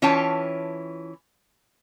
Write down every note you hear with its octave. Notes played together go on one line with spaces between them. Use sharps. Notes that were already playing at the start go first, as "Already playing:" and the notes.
E3 C#4 F4 C#5 G5 A5